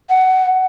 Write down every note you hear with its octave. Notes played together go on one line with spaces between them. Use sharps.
F#5